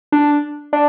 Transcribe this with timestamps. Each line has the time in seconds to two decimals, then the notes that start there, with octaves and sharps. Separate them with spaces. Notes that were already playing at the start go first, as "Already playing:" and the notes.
0.12 D4
0.73 D4